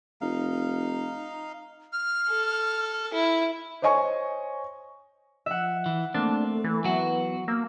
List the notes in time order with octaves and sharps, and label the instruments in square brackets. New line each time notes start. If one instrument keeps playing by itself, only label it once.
[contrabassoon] F1 [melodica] D#4 F5
[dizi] F6
[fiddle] A4
E4
[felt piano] C5 C#5 D#5 G#5 C#6
[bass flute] F3 [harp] E5 F#5
[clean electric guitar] E3
[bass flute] A3 [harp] A#3 [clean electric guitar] C4 [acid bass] D4
[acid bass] E3
[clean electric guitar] F#3 F#4 [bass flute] B3
[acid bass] A#3 [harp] E6